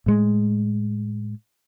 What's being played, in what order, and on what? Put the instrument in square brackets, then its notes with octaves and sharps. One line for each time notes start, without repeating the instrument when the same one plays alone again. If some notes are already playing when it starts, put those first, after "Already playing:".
[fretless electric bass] A2 G#3